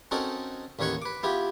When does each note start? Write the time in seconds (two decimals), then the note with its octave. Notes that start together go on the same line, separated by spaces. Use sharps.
0.11 C4 C#4 D#4 F#4 A4 A#4
0.79 A1 D#2 D#3 C#5 F#5 C#6
1.02 B4 D6
1.23 B3 E4 F4 G4